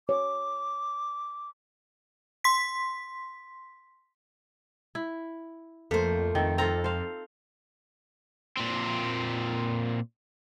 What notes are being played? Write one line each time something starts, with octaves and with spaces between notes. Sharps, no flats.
C#5 D6
C6 B6
E4
F2 A3 A#3 C5
F2 D#3 A4
C4 F4 A4 A#5
C5 F5
A#2 C4